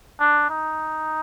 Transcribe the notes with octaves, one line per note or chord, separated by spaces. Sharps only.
D4
D#4